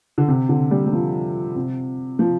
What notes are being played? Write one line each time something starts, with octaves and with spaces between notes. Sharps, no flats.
D3
C3
D3
G3
G3
F3
C3
F3